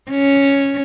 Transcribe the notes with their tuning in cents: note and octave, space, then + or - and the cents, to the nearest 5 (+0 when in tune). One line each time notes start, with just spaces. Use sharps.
C#4 +0